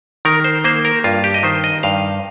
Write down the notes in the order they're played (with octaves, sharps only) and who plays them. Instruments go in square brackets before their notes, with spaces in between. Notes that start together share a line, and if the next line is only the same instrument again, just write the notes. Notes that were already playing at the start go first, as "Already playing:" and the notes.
[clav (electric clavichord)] D#3 A#4
C5
A#3 C5
A#4
G2 F4
G4
D#5
D#3 C5
D#5
G2 F5